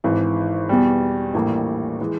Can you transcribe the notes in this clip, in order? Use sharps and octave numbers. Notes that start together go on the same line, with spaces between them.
G#1 G#2 E3
E2 B2 G3
A#1 A2 E3 G3 A#3
E3 G#3